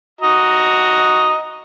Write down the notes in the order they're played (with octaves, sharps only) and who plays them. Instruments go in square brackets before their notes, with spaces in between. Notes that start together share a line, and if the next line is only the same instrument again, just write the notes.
[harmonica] F#4 D#5 A#5